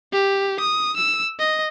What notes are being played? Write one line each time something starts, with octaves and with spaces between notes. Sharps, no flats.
G4
D#6
E6
D#5